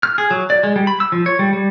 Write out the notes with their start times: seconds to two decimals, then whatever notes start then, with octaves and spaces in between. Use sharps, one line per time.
0.03 F6
0.18 G#4
0.31 F#3
0.50 D5
0.63 G#3
0.76 G3
0.87 B5
1.00 E6
1.12 F3
1.26 C#5
1.39 G3
1.53 G3